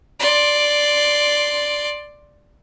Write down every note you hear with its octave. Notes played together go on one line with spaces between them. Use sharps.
D5 C6